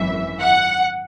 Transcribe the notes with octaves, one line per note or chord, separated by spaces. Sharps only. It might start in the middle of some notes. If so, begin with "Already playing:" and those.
Already playing: G#1 F#2 E3 E5
F#5